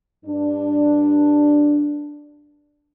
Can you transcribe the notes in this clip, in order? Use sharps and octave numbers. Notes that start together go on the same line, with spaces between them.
G2 D4